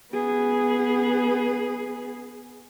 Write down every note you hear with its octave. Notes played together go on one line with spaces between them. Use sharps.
B3 G#4